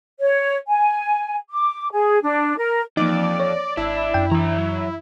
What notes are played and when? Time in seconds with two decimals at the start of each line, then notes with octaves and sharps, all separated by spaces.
0.20 C#5
0.68 G#5
1.50 D6
1.92 G#4
2.22 D4
2.57 A#4
2.97 F2 E3 F3 A#3 D#4 D5
3.40 C#5 A#6
3.77 G#1 D4 E4
4.14 F#2 G5
4.32 E3 D4 A#5
4.58 F#3